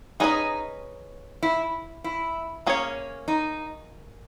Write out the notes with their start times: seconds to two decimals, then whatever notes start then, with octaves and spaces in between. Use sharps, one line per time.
0.20 C#4 D#4 G#4 B4 D#5
1.43 E4
2.04 E4
2.67 A#3 C#4 G#4 C#5
3.28 D#4